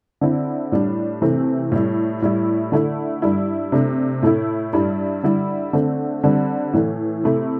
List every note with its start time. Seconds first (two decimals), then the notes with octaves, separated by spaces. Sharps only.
0.21 D3 C4 E4
0.72 A2 G3 D4
1.22 C3 E3 A3 C4
1.72 A2 G3 E4
2.22 A2 G3 E4
2.72 D3 A3 E4
3.22 G2 G3 E4
3.72 C3 A3 D4
4.23 A2 A3 E4
4.73 G2 G3 E4
5.23 D3 G3 E4
5.73 D3 A3 C4
6.24 D3 G3 C4
6.73 A2 E3 A3
7.24 C3 A3 E4